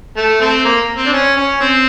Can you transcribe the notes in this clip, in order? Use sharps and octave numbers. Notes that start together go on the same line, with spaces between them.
A3
A3 C4
A#3
C4
D4
C#4
C#4
C4